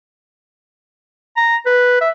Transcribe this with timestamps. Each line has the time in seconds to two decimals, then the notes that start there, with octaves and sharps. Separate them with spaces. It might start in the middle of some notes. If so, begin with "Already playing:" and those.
1.37 A#5
1.66 B4
2.01 E5